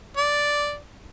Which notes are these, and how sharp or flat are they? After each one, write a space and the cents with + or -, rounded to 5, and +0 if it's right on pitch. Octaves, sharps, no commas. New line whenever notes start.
D5 -5